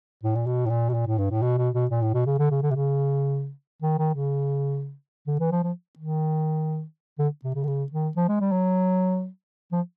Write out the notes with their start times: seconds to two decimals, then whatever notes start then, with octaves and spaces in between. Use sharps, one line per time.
0.23 A2
0.35 A#2
0.46 B2
0.66 A2
0.70 A#2
0.90 B2
0.94 A#2
1.07 A2
1.18 G2
1.31 A2
1.42 B2
1.58 B2
1.74 B2
1.91 A#2
2.02 A2
2.14 B2
2.26 C#3
2.39 D3
2.51 C#3
2.63 D3
2.71 C3
2.75 C#3
3.82 D#3
3.99 D#3
4.15 C#3
5.27 D3
5.40 E3
5.52 F3
5.63 F3
5.99 D#3
7.19 D3
7.44 C3
7.55 C#3
7.63 D3
7.67 C#3
7.92 D#3
8.17 F3
8.29 G#3
8.41 G3
8.52 F#3
9.72 F3